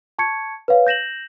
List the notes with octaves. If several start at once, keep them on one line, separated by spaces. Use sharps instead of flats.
A5 C#6 G#6 C#7
B4 C#5 F5
G6 A#6 E7 F#7